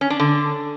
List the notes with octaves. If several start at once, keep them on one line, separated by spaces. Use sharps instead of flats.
C#4
D4
D3